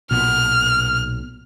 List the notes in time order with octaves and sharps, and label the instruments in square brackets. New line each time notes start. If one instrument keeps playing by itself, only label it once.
[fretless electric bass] B1 A#2 B3 [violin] F6